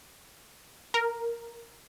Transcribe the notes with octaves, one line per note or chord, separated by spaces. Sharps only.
A#4